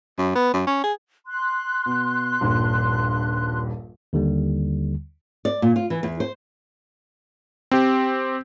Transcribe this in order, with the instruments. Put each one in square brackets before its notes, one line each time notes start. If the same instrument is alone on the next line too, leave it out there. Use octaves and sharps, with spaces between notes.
[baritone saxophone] F#2
B3
F#2
C#4
G#4
[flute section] C6 F#6
[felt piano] B2
D#1 A#1 G2
[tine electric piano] D#2 D3 G3
[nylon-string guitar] D5
A#2
F4
E3
E2
C5
[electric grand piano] C4 G4